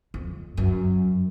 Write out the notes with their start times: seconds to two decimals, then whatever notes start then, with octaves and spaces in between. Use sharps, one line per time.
0.14 F2
0.57 F#2